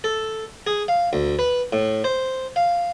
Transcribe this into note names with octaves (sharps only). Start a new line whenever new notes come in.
A4
G#4
F5
D2
B4
A2
C5
F5